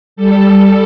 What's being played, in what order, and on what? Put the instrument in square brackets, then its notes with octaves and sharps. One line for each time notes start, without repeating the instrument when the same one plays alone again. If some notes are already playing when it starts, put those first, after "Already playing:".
[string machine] G3 A4